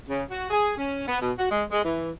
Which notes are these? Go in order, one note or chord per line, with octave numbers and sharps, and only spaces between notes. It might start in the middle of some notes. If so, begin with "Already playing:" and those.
C#3
F#4
G#4
C#4
B3
B2
F#4
G#3
G#3
E3